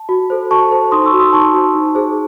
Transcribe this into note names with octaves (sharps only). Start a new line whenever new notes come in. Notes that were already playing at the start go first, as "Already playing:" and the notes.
Already playing: A5
F#4
A4 C5
F#4 A5 C#6
A4 C5
D#4 C6 D#6
C#6 E6
F#4 C5
C6 D#6
D#4 A5 C#6
F#4 C5
D#4
G#4 C5